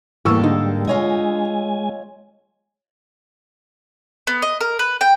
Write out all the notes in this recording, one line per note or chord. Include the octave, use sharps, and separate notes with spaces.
E2 G#2 G3 A#3 A4 C#6 E6
D3 D#4
G#3 F4 C#5 D#5 G#5
B3
D#5
A#4
B4
G5